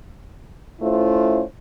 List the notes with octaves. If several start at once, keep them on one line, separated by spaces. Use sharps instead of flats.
A3 C#4 E4 F4 C5